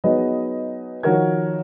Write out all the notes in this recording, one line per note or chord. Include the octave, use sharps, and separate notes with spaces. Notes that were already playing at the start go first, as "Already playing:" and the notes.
F#3 B3 D#4 G#4 B4 D#5
D#3 F3 F#4 A#4 C#5 G#6